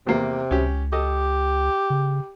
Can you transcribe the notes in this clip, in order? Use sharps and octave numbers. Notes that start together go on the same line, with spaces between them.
E2 C3 A#3
C#2 C#4 G4
G4 A4 D#5
C#3